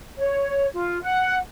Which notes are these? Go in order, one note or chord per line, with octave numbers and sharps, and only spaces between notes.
C#5
F4
F#5